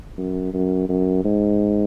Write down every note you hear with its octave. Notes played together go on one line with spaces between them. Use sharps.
F#2
F#2
F#2
G#2